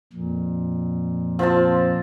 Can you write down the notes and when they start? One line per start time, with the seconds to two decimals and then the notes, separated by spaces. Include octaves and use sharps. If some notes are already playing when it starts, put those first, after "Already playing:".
0.13 F2 A#2
1.39 F3 C4 F4 A5